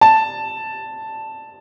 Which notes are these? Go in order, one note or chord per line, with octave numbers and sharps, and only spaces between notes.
A5